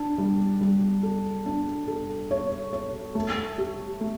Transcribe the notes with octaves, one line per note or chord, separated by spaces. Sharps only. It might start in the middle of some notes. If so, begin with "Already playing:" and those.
Already playing: D4
G3
G3
A4
D4
A4
C#5
C#5
A3
G4
A3